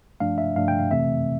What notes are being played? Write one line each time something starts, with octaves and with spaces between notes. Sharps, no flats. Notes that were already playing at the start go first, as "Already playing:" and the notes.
G2 F3 A3 D4 F5
E5
G2 F3 A3 D4 F5
G5
F5
F2 C3 E3 A3 C4 E5